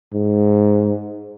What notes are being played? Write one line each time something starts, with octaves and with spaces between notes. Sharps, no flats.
G#2